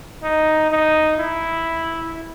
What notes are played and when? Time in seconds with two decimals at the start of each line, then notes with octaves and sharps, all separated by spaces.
0.23 D#4
0.70 D#4
1.18 E4